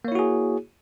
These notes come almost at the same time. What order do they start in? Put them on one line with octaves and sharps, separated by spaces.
A#3 C#5 E4 F#4 G#4